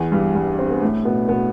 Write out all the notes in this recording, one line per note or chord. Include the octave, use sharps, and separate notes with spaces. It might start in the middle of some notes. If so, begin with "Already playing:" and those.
Already playing: E2 E3
G2 G3
G2 G3
C4
B3
A2 A3
B2 B3
B2 B3